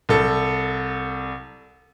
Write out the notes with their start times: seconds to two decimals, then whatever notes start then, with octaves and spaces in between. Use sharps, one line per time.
0.09 C2 A4